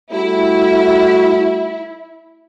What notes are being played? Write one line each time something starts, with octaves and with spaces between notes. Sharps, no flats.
G3 A3 E4 F#4